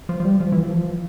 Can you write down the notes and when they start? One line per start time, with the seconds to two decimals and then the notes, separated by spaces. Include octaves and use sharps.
0.09 F3
0.20 F3
0.25 G3
0.40 F3
0.52 E3
0.64 F3